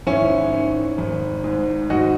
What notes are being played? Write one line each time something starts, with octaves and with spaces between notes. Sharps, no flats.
G#1 C#4 E4
D#3
G#1
G#2
G#1 D#4 F#4